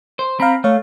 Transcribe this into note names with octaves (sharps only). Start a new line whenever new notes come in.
C5
C4 F5 A#5 B5
A3 C#5 F5